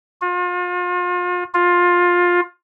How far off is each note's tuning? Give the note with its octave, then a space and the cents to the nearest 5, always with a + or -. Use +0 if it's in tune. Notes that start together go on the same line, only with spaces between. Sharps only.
F4 +35
F4 +15